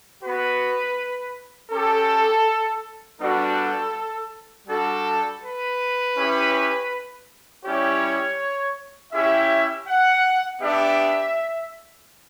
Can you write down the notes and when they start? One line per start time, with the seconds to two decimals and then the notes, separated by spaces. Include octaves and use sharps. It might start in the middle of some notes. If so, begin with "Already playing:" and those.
0.23 B3 F#4 B4
1.71 C#4 G4 A4
3.20 G3 B3 D4 F#4 A4
4.68 G3 D4 F#4 A4
5.42 B4
6.16 C#4 E4 G4
7.64 G3 C#4 E4 G4 C#5
9.13 C#4 E4 G4 E5
9.87 F#5
10.61 B3 D4 G4 E5